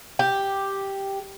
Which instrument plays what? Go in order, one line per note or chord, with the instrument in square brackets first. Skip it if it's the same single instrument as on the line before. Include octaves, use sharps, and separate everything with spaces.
[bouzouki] G4